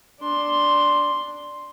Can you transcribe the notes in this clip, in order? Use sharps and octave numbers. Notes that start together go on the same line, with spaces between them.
D4 C6